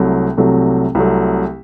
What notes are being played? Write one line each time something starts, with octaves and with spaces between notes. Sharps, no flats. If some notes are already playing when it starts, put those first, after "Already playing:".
Already playing: C2 C3 F#3 A3
C2 C3 F#3 A3
C2 C3 F#3 A3